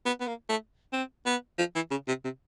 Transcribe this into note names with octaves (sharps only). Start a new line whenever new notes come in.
B3
B3
A#3
A3
C4
B3
F3
E3
C#3
C3
C3